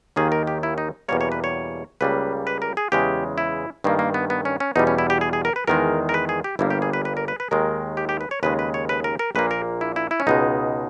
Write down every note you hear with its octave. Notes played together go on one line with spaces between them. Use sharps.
D#2 D#3 A#3 G#4
A#4
G4
E4
D#4
E2 B2 G3 A#3 C#5
C#5
B4
C#5
C#2 C#3 G3 A#3 B4
B4
A#4
G#4
E2 C#3 G#3 G4
E4
G2 D#3 A#3
A#3
B3
B3
C#4
C#4
E2 B2 G3 D#4
C#4
E4
G4
G#4
G#4
A#4
B4
E2 D#3 G#3 A#4
A#4
B4
G#4
G4
G1 G2 G3 A#3 E4
G4
G#4
B4
B4
A#4
B4
B4
D#2 D#3 G#3 A#4
G4
G4
B4
C#5
D#2 C#3 G#3 B4
B4
C#5
B4
A#4
A#4
A#1 A#2 A#3 B4
A#4
E4
E4
E4
C#4
C#2 B2 G#3 D#4